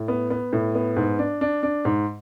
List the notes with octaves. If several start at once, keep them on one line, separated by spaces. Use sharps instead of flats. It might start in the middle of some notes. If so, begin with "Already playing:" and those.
Already playing: A2
B3
B3
A2
B3
G#2
D4
D4
D4
G#2